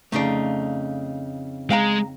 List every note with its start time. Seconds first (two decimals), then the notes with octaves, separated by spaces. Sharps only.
0.12 F2 C#3 A3 D#4 D5
1.71 G#3 F5 G5 A#5